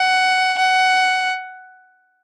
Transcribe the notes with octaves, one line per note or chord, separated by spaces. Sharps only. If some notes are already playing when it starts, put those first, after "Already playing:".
Already playing: F#5
F#5